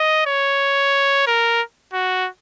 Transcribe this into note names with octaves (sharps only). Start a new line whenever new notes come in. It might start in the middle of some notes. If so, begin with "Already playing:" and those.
Already playing: D#5
C#5
A#4
F#4